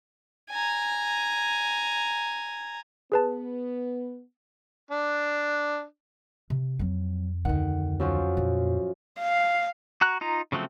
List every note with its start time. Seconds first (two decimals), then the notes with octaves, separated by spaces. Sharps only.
0.50 G#5 A#5
3.12 B3 G#4 B4 A5
4.91 D4
6.50 C3
6.79 F2 F#3 C4
7.45 D2 D#3 F#5
8.00 F#2 F3 F#4
8.37 A#2
9.19 F5
10.01 F#4 A#5 F#6
10.21 D#4 F4 A#5
10.52 C#3 F3 F#3 A3 C4